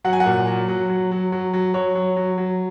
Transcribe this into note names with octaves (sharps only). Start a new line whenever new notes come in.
F#3 F#5
G#5
F#5
A#2
F#3
F#3
F#3
F#3
F#3
F#3
F#3 C#5
F#3
F#3
F#3